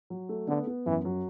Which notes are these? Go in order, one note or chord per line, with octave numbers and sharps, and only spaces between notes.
F#3
A3
D3 B3
B3
F#2 E3
F#3